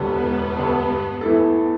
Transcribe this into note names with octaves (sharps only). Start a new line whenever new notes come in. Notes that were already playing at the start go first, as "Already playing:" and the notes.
Already playing: E1 D2 D3 G3 B3
E1
D2 D3 G3
G2
E3 A3 E4 A4